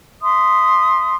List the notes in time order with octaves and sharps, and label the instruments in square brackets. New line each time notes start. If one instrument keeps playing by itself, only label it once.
[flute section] E5 C6 D#6